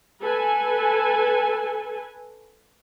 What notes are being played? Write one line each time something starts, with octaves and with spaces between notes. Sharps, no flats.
A4 B4 G#5